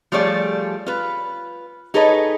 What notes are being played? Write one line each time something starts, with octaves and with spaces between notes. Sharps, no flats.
F3 G3 A3 G#4 C#5 D5
F4 B4
D#4 G#4 A4 B4 C#5 D#5